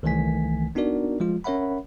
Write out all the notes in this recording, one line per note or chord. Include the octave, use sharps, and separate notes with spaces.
C2 D#3 E3 A3 G#5 B6
B3 D4 D#4 F#4 A#4 D5
F3 G#3 F4
C#4 A#4 C#5 E5 F#5 B5